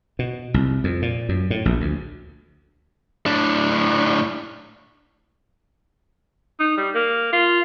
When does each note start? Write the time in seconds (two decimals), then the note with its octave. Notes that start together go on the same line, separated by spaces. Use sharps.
0.19 B2
0.54 C2
0.84 F2
1.02 A#2
1.29 F#2
1.50 A2
1.65 A#1
1.80 D2
3.26 A2 D4
6.60 D#4
6.77 G3
6.95 A#3
7.33 F4